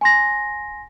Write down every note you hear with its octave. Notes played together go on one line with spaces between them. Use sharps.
G#5 C6 A#6